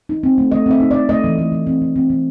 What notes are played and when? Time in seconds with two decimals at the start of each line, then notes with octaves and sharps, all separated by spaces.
0.09 D#4
0.23 C4
0.38 A3
0.52 A3 D#5
0.66 C4 E5
0.80 D#4
0.91 D#4 D5
1.09 A3 D#5
1.24 E3
1.39 A3
1.52 E3
1.67 C4
1.82 E3
1.96 C4
2.10 E3